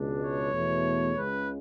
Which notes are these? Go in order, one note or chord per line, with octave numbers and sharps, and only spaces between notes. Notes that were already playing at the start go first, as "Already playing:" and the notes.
Already playing: C#2 B2 G#3 D4
C#5
E2 B2 A3
C#2 C#3 G#3 B4